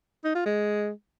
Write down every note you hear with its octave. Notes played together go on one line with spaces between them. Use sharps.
D#4
F4
G#3